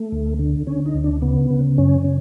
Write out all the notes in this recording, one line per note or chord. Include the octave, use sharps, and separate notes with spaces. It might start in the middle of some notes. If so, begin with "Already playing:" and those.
Already playing: A3
D2
D3
D3 C#4
D#4
D2
D4
C#3 B3
C#3
F#2 C#4
C#3